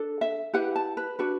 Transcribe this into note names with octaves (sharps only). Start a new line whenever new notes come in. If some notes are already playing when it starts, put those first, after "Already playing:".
Already playing: D4 A4
E5
E4 G4 B4 F#5
A5
B4
D4 F#4 B4